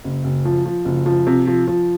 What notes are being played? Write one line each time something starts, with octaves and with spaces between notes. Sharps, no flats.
F#1
F#1
F3
F3
F#1
F3
C3
F3
F3